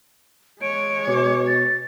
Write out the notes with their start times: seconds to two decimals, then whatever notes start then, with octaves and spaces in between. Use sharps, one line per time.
0.62 G#3 C#5 D7
1.08 B2 D6
1.47 A6